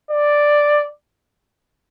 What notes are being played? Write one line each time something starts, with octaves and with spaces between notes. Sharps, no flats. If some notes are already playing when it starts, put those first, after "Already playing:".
D5